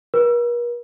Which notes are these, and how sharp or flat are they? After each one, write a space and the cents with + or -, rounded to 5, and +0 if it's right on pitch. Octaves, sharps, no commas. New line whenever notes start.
A#4 +45